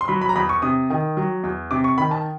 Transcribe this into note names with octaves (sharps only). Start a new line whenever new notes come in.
C6
F#3 B5
B5
A#5
E2 B5
C#6
C3 D#6
D#3
F#3
E2
C3 D6
C#6
D#3 B5
A5